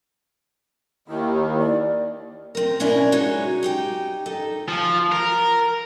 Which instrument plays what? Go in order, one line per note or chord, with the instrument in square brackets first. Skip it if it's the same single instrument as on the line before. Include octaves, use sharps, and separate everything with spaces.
[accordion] D#2 D#3 [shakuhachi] E4
[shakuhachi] D5
[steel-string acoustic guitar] C4 A#4
B2 C#4 D4 E4 A#4
G#3 D#4 F#4 C#5
D#4 G4 G5
D#4 A4
[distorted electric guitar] F3
A#4